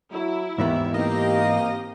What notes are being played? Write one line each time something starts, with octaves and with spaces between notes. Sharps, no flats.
F#3 E4
D#2 G#2 D#3 E3 B3 E5
A#3 C4 D#4 G4 D#5 F5